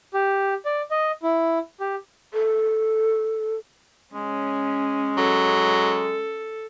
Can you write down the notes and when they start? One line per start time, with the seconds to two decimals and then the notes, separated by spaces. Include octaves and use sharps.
0.14 G4
0.65 D5
0.91 D#5
1.23 E4
1.80 G4
2.33 A4
4.14 G#3 C#4
5.17 F#3 A4